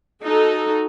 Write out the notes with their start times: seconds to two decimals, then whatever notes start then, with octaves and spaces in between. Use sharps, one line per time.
0.23 D#4 F#4 A4